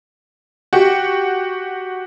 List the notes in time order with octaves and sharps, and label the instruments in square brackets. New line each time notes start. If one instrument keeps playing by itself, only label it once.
[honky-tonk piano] F#4 G4